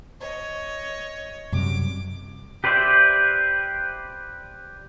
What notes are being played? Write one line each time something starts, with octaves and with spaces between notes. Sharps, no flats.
C#5 D#5
F#2 C3 G3 D6
G4 B4 C5 D5 E5